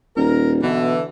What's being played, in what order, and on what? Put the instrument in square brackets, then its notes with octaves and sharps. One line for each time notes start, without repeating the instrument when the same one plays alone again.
[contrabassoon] D#1 [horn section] A#4
[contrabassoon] B2 [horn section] D3 E3